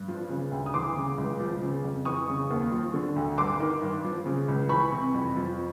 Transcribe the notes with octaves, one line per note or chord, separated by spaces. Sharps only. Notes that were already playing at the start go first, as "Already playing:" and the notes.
Already playing: G2
F3
C#3
D2
D#6
E3 C6 D6
C#3
C#2
F3
C#3
F2
E3 C#6 D#6
C#3
D#2
F3
D3
D2
G2 C6 D6
D#3
G2
F3
C#3
C#2
E3 B5 C#6
C3
F2
F3